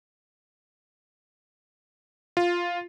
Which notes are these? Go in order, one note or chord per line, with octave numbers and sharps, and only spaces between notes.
F4